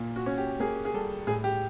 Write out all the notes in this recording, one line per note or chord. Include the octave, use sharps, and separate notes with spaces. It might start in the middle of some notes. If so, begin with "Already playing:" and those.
Already playing: A#2
F#4
C#4
G4
A#3 G#4
G#4
G3 A4
A2 G#4
G4